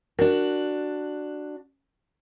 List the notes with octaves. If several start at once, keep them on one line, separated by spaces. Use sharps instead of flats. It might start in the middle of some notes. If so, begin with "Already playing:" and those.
D4 F#4 A#4